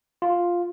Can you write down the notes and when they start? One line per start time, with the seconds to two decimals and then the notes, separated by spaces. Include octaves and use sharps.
0.22 F4